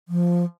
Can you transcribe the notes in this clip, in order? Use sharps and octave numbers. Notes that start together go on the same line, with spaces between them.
F3